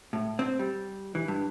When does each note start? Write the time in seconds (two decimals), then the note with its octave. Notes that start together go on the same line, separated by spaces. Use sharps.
0.13 A2
0.39 C4
0.59 G3
1.15 E3
1.28 G2